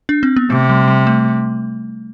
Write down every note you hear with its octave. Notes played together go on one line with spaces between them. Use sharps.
D4
C4
B3
C3 A3
G3
G3
A3